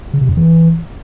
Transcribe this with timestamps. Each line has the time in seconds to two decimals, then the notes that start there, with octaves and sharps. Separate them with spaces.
0.14 C#3
0.21 C3
0.29 F#2
0.37 E3